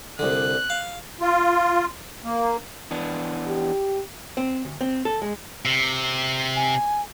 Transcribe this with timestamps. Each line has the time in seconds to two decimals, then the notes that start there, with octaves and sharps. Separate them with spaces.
0.19 C2 D3 F#6
0.70 F5
1.21 F4
2.24 A#3
2.91 E3 B3 D4
3.47 G4
4.37 C4
4.65 D2
4.81 C4
5.05 A4
5.22 G#3
5.65 C3
6.56 G#5